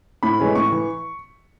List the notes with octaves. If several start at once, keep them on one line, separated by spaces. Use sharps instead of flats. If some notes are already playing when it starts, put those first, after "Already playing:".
A2 B5
E3 G#3 C#4
A2 C#6
E3